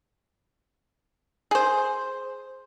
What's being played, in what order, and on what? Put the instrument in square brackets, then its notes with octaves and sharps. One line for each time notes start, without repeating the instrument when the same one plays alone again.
[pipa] G#4 C5